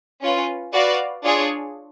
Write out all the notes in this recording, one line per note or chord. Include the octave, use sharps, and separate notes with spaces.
C#4 F4 B4
F#4 B4 D5 F5
D4 F4 G#4 C#5